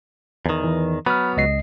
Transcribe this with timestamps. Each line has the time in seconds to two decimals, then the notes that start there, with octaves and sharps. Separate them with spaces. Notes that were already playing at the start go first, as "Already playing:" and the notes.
0.46 E2 D#3
0.64 E3
1.06 F#3 B3 B5 F6
1.37 C#2 D#5 C7